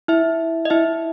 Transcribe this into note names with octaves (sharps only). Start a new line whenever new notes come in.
E4 E5
D#5
E4 E5